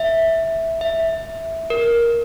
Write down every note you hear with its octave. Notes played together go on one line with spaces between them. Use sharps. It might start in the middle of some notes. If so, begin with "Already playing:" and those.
Already playing: E5
E5
A#4